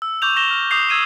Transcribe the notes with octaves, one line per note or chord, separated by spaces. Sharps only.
E6
C#6 D6 G6 F7
C#6 A#6 E7 G7
F6
D6 D#6 G6 C7 F7
D#6 E6 G#6 D#7 E7